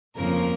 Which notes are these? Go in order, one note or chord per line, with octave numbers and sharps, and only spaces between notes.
G1 F2 C#3 F3 A#3 A#4